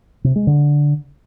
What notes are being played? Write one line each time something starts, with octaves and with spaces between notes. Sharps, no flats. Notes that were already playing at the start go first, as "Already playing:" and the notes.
C3
G#3
D3